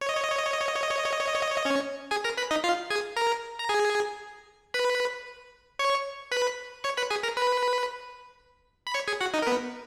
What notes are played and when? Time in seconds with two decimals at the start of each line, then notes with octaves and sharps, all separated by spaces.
0.01 C#5
0.09 D#5
0.16 C#5
0.24 D#5
0.31 C#5
0.38 D#5
0.46 C#5
0.53 D#5
0.61 C#5
0.68 D#5
0.76 C#5
0.83 D#5
0.91 C#5
0.98 D#5
1.05 C#5
1.13 D#5
1.21 C#5
1.28 D#5
1.35 C#5
1.42 D#5
1.50 C#5
1.58 D#5
1.65 C#4 C#5
2.11 G#4 G#5
2.24 A#4 A#5
2.37 B4 B5
2.51 D#4 D#5
2.64 F4 F5
2.90 G#4 G#5
3.16 A#4 A#5
3.59 A#5
3.69 G#4 G#5
4.74 B4 B5
5.79 C#5 C#6
6.32 B4 B5
6.84 C#5 C#6
6.97 B4 B5
7.10 G#4 G#5
7.23 A#4 A#5
7.37 B4 B5
8.87 B5
8.94 C#5 C#6
9.08 G#4 G#5
9.21 F#4 F#5
9.34 D#4 D#5
9.42 A#4
9.47 B3 B4